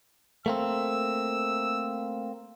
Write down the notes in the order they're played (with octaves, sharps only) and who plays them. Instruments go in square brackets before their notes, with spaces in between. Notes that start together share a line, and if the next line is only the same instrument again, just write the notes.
[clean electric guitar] A3 A#3 C4 [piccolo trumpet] E6